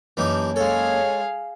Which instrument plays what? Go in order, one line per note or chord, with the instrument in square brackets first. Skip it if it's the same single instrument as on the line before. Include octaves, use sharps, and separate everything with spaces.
[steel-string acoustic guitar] F#2 A#3 A5 [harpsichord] E3 D#4 G4
[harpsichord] G#3 A4 [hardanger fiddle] G#4 F5 [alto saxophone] C#5